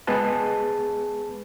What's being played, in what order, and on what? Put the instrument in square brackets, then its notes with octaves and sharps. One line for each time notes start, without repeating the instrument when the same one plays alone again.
[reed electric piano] G#3 B3 G#4 B4 A5